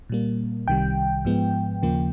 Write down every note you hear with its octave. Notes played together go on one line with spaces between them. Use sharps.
A#2 G3 A#3
C2 C3 D#3 G3 G5
G#2 F3 G#3 B3
D#2 C#3 F3 A#3